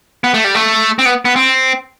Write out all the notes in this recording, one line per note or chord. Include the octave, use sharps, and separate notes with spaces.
B3
A3
G3
A3
C4
B3
B3
C4